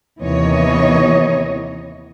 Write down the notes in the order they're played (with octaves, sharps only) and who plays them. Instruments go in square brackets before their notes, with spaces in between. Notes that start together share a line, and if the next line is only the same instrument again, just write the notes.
[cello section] D#2 C3 E3 B3 C#5 D#5